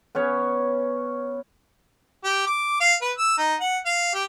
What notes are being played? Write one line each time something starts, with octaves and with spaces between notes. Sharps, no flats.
B3 C#4 C#5
G4
D6
F5
B4
E6
D#4
F#5
F5
G4